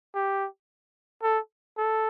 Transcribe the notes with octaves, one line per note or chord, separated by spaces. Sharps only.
G4
A4
A4